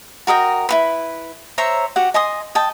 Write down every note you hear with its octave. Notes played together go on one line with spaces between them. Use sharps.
F#4 A#4 D#5 G5
E4 F#4 B4
C5 C#5 E5 A#5
F#4 G4 F#5
D#5 G#5 C6 D#6
D#5 G5 A5